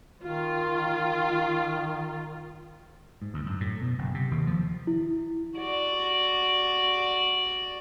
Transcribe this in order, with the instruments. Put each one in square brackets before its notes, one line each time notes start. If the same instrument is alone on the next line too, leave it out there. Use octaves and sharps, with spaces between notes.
[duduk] D#3 [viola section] F4
[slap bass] G#2
D2
F#2
A2
B2
F#1
C3
D#2
F3
[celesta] E4
[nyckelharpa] F#4 D5